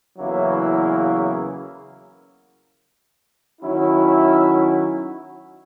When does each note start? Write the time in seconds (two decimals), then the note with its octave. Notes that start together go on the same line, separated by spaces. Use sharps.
0.17 E2 C#3 F#3 A#3 E4
3.62 D#3 F#3 C#4 E4